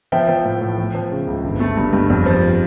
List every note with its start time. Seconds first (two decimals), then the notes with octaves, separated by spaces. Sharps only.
0.12 F3 E5 G5
0.29 F3
0.45 A2
0.61 A2
0.78 F3
0.94 F3
1.11 C#3
1.27 C#2
1.44 G1
1.60 A3
1.77 G2
1.93 G2
2.10 F2
2.26 F3